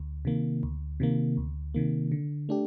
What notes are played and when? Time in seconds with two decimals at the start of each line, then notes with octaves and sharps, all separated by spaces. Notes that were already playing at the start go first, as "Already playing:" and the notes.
Already playing: D2
0.25 C3 D#3 A#3
0.63 D2
1.00 C3 D#3 A#3
1.37 D2
1.74 C3 D#3 A#3
2.12 D3
2.49 A3 D4 G4